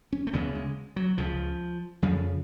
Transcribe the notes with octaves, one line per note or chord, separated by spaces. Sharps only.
C#4
A3
D2 C#3 B3
G#3
F#3
C#2 C#3 F3
F2 C#3 F3